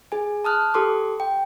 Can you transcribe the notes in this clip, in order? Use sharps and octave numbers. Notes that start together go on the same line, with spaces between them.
G#4 G#5
A5 D#6 F6 F#6
G4 A4 C6 D6
G5